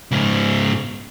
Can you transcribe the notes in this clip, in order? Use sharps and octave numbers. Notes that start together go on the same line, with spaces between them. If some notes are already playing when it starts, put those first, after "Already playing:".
G#2 C#3